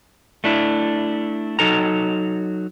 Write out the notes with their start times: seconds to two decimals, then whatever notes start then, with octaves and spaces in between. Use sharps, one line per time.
0.44 A3 D4 E4
1.59 F#3 D#4 A4 A#5